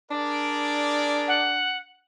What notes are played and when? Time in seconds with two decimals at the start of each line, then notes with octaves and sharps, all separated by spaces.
0.11 D4 G#4 A#4 D5
1.28 F#5